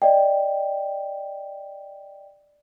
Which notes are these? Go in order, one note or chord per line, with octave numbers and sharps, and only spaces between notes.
D5 D#5 G5